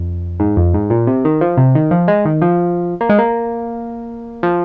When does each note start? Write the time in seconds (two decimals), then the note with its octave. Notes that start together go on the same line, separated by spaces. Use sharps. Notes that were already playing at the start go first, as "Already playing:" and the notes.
Already playing: F2
0.40 G#2
0.57 F2
0.74 G#2
0.90 A#2
1.07 C3
1.25 D#3
1.41 F3
1.57 C3
1.75 D#3
1.91 F3
2.08 G#3
2.25 D#3
2.42 F3
3.01 A#3
3.09 G#3
3.19 A#3
4.43 F3